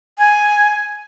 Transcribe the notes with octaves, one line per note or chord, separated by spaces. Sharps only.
G#5